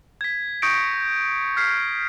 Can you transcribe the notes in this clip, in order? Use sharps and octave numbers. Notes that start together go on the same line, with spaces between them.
G#6 B6
C#6 D#6 G6 A#6 C#7 D7
F6 G#6 B6 C7